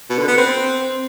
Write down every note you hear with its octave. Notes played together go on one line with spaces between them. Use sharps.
B2
D3
B3
C4